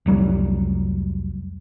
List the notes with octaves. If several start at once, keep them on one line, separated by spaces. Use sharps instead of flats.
F1 C2 F#3 G3